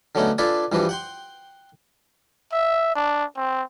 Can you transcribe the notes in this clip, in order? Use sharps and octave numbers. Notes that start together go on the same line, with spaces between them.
D3 F#3 A3 B3 C#4 D#4
D4 F4 A4 B4 D5 G#5
G2 E3 F3 G3 F#4
F#5 G5 C6
E5
D4
C4